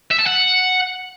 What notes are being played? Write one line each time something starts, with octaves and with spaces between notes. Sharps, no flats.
E5
A5
F#5